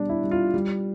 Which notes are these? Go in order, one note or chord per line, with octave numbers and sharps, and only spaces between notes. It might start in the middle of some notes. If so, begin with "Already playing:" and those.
Already playing: B2 G3 D4
E4
G3
F4
G3